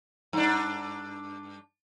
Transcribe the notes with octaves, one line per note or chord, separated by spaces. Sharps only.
G2 D4